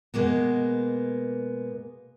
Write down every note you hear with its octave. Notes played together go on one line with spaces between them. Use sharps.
B2 G#3 A#3 B3